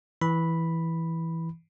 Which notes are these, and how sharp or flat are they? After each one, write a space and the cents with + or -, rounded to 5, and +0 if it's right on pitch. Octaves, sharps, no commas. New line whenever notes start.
E3 -5 B5 +0